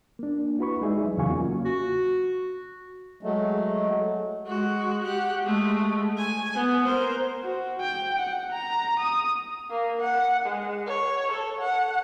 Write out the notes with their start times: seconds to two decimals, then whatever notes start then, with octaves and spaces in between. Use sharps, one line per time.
0.19 A#3 D4
0.59 E4 F#4 B4 B5 C#6
0.81 G#3 D#4 G#4 D5 E5
1.04 F#3
1.17 E2 C#3 F#3 F5 G#5 C#6
1.29 A#3 C#4 F4 F#4
1.65 F#4
3.23 F#3 G#3 A3
4.47 G#3 F#4
5.04 G4 F#5
5.43 G#3 A3
6.18 G#5
6.55 B3
6.84 A#4 C5
7.44 F#4
7.81 G5
8.20 F#5
8.52 A#5
9.00 D#6
9.70 A#3
10.01 F#5
10.46 G#3
10.87 C#5
11.31 A4
11.60 F#5